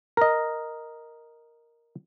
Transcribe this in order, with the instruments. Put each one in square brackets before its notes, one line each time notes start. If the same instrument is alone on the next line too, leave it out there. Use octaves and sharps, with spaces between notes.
[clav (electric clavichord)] A#4 D#5